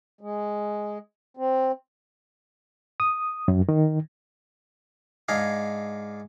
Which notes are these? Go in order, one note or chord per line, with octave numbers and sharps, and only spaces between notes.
G#3
C4
D#6
F#2
D#3
G#2 D4 G#4 D#5 F5